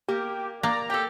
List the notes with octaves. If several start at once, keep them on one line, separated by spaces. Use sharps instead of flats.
A#3 G4
A#3 D5 A#5
G4 A4 G5